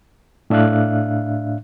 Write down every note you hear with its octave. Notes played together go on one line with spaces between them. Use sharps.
A2 D4 E5 F5 F#6